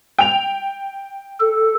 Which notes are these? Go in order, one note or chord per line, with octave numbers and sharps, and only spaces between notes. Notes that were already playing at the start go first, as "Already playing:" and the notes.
G5 F7
A4